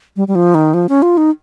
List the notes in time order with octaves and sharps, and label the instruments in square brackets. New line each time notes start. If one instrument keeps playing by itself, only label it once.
[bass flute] G3
G3
F3
D#3
F3
C#4
F4
D#4